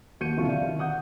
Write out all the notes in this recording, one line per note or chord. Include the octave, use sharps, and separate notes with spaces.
D#2 F#4 G6 C#7 D#7
E1 C2 D3 F#3 F4 C#6
D5 E5 F5
D#3
F#5 D#6 G6